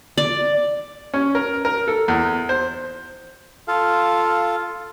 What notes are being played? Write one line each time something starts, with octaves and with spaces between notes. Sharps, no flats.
D5
C#4
A#4
A#4
A4
E2
C5
F4 A4 F5